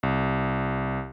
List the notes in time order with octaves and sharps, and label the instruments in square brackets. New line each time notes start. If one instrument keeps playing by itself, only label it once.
[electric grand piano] C2